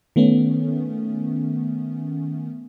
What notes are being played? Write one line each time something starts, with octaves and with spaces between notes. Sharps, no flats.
D#3 A3 B3 C#4